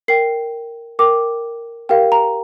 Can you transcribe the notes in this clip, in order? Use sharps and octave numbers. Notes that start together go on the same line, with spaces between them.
A#4 G5 C7
A#4 G5 D6
G4 A#4 F5 G5
A#5